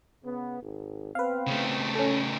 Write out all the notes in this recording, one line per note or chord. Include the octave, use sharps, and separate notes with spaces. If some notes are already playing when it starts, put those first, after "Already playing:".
C#3 B3
G#1
B3 C4 B4 F5
C#3 A3
C#4 A4